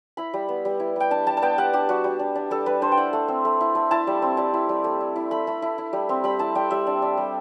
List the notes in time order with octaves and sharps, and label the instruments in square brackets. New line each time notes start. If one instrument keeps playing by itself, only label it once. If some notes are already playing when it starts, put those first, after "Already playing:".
[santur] E4 B5
G3
B3
G3
E4
G3 G5
D4 A5
G3 A5
A5
B3 G5
G3 F#5
D4 G4
G3 F#4
G3
D4
D4
G3 A4
G3 B4
D4 C5
G5
E4 F#5
A3
C4
A3
E4
A3
E4 A5
G3
C4
G3 A5
E4
G3
A3
E4
E4
A3 B5
A3
E4
E4
G3
C4
G3 B5
E4 A5
G3 G5
G3 E5
D4
D4
G3